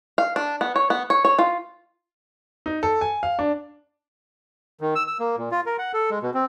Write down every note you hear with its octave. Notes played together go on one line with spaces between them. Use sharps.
F5
D4
B3
C#5
B3
C#5
C#5
F4
D#4
A4
G#5
F5
D4
D#3
E6
E6
A#3
A#2
F4
A#4
F#5
A4
G#3
B2
C4